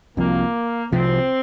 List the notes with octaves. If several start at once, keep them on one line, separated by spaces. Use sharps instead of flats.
C2 C3 F3 A#3
C2 C3 F3 C4